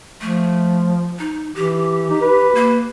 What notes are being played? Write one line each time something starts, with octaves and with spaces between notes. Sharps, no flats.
F3 A3
D#4
E3 G4
D#4
B4
A#3